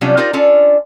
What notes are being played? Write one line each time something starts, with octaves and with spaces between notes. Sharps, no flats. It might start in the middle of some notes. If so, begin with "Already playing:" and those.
C3 F#3 G3 C#4 D4 F4
D#4 F4 G4 A#4 C5 D5
C#4 D4 F4 A4 D5